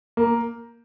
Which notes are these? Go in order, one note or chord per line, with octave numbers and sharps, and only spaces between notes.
A#3